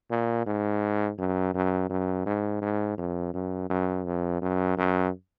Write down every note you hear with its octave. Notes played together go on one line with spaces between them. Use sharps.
A#2
G#2
F#2
F#2
F#2
G#2
G#2
F2
F#2
F#2
F2
F#2
F#2